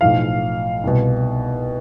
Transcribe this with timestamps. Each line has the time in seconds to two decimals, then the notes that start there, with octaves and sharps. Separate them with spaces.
0.01 B1 A2 F3 F5
0.84 C2 B2